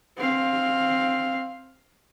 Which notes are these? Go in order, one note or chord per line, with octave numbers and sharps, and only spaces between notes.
C4 F5